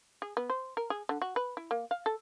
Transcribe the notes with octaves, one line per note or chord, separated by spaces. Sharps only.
G#4
B3
C5
A#4
G#4
D3
F#4
B4
E4
A#3
F5
A4